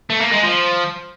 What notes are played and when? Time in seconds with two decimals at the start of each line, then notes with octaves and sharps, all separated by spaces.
0.10 A3
0.21 A#3
0.32 G#3
0.43 F3